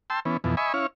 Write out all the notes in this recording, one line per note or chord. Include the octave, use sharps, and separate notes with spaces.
G5 A5 C6 E6
E3 B3 C#4
F2 B2 E3
D#5 E5 G#5 B5 C#6
C#4 E4 C#5 F5